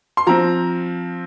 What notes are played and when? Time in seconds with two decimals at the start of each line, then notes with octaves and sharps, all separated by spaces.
0.17 C6
0.27 F3 C4 A#5